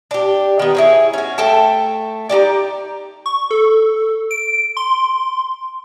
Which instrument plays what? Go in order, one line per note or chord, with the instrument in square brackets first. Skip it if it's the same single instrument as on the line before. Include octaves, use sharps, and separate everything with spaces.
[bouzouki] D4 G4
D#3 B3
E4 G#4 C#5
C#4 F#4
A3 A4 G5 A5
D#4 F#4 G4 D5
[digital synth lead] C#6
A4
D7
C6